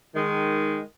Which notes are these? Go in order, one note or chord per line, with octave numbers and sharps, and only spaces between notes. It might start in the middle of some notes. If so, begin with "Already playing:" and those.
D#3 G#3